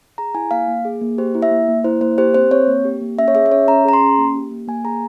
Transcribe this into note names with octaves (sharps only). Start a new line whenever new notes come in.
G#4 A#5
E4 G#5
A#3 F5
A#3
G#4
A#3
G4 C5
E4
E5
A#3
A#3
E4 C5
A#3 C5
G4 C5
C4 C5
C4 C#5
A#3
G4
A#3
C#4 E5
C#5
G#4 E5
E5
C#4 C#5
C#4 A#5
G#4 A#5
C6
C#4
A#3
G4
A#3
A#3 G#5
G#4 A#5